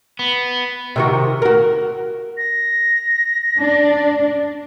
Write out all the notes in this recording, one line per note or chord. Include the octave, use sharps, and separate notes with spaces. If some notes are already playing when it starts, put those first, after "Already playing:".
B3
C3 D#3 F#4
F#4 A#4
A#6
D4